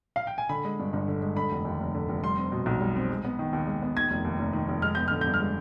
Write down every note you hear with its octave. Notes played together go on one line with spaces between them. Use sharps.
F5
G5
G#5
D3 B5
G#3
G2
G1
D3
G#3
D3 B5
F1
D#2
F1
D3
F1
G3 C6
C4
B2
B1
G3
C4
G#3
B3
D#3
D#2
G#3
B3
D#3 G#6
F1
D#2
F1
D#3
F1
G#3 F6
B3 G6
D3 F6
G6
G2
F6
G#3